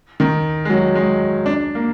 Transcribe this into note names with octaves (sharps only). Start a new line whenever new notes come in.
D#3
G#3
F#3
G#3
D4
A#3